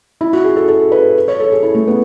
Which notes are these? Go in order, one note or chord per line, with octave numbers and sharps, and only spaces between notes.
E4
F#4
G#4
A4
A4
B4
C#5
A4
G#4
E4
A3
B3